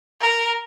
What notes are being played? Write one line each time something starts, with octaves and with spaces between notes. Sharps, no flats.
A#4